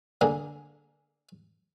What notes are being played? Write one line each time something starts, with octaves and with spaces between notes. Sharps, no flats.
D3 A#3 G#4